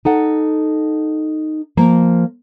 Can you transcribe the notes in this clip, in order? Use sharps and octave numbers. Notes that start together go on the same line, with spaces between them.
D#4 A4 F#5
F3 A#3